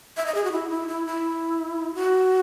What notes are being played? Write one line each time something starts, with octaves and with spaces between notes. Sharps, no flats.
E5
D#5
G#4
F#4
E4
E4
E4
E4
F#4